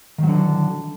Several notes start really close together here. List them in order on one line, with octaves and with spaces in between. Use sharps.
D#3 F#3 D3